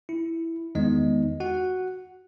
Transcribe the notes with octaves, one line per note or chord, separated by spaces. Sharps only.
E4
E2 D#3 G#3 B3 D#4 D#5
F#4 F#5